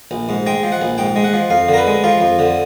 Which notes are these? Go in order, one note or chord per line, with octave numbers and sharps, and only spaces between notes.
A#1
G#2
G#3 G5
F3
F#5
A#1
G#2 G5
G#3
F#5
F3
F2 F5
D3
A#4
B4
G#3
F3 F4
F2
D3